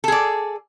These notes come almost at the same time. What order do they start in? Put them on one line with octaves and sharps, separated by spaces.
A4 G#4 D5